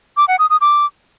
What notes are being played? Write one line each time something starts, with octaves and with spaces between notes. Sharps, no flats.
D6
F#5
D#6
D#6
D6